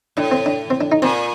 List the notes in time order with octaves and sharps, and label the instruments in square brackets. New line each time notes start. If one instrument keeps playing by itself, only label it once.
[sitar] A2 [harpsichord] D4
[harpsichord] C4
D4
C4
D4
D#4
[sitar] A#2 [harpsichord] C4